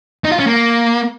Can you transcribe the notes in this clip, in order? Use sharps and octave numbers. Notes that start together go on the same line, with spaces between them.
D#4
F4
C#4
A#3